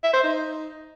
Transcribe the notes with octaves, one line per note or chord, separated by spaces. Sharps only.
E5
C5
D#4